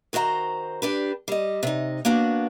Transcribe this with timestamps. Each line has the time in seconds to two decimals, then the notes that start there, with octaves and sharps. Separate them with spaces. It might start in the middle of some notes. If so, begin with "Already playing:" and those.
0.13 D#3 F#4 C5 E5 A#5
0.82 D4 G4 B4
1.28 G3 D#5
1.63 C3 D#4
2.05 A#3 B3 D4 F#4